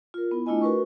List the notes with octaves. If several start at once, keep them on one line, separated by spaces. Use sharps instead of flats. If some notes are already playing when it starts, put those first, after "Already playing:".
F4 A#4
B3 E4
A3 D4 E4 F4 D#5 G#5
F#4 A#4 B4 C#6